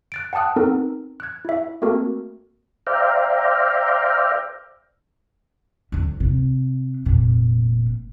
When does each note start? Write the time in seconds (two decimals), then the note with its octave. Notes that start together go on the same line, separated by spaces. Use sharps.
0.12 F#6 A6 D7
0.33 F#5 G5 A5 D#6 F#6
0.56 B3 C4 D#4 A4 A#4
1.20 F#6 G#6
1.45 E4 E5
1.82 A3 A#3 C4 F#4 A4 A#4
2.87 C5 D5 E5 F5 G5 A#5
5.92 D2 D3
6.20 C3
7.05 F1 A#2